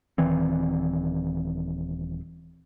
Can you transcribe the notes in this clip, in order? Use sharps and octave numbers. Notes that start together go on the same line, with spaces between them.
D#1 D#3 E3 C4